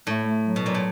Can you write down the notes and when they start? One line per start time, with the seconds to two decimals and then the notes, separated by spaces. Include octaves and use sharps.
0.07 A2 A3
0.26 A3
0.46 F#3
0.56 B2
0.64 A#2 F#3
0.74 A2